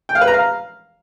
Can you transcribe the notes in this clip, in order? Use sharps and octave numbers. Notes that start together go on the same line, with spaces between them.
G5
F5
B4
A#5
F5